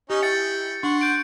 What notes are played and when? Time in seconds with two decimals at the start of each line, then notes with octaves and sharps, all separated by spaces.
0.10 C#4 D#4 G4 C#5
0.23 E4 G5 A6 C#7
0.83 D4 F#5 C6 C#6
1.01 G6 D7